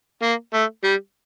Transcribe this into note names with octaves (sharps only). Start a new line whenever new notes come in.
A#3
A3
G3